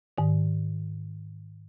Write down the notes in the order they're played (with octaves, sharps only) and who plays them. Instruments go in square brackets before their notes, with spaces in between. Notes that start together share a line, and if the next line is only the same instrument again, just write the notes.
[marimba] G#2 D#3